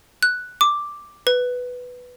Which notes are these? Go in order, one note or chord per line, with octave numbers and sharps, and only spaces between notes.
F#6
D6
B4